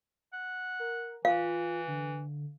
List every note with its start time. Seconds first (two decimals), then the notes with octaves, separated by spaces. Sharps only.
0.33 F#5
0.79 A#4
1.25 E3 F4 F5
1.88 D3